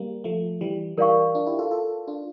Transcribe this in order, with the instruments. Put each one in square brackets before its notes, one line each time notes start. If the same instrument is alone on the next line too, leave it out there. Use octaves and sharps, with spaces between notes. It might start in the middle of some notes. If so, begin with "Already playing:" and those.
Already playing: [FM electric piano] G3 A#3
F3 A3
E3 G3
[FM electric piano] E3 G3 [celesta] A#4 D5 F5 C#6
[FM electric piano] D4 F4
E4 G4
F4 A4
F4 A4
D4 F4